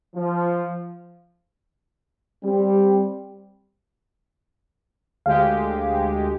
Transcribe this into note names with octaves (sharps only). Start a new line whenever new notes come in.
F3
G3 C4 G4
D2 G#3 G4 F5